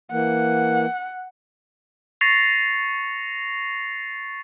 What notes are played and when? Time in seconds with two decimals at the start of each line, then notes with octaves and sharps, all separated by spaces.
0.11 E3 A#3 F#5
2.21 C#6 A6 A#6 C7 C#7 F7